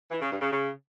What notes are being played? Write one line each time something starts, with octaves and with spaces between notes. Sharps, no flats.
E3
C#3
G2
C#3
C#3